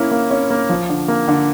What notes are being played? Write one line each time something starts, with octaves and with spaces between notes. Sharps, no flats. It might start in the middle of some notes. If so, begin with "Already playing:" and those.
Already playing: A#3 C#4 E4
A#3
C#4
A#3
F3
D3
A#3
D3